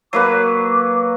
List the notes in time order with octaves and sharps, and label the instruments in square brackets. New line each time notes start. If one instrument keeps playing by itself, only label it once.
[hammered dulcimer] F#3 A#3 B4 [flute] D6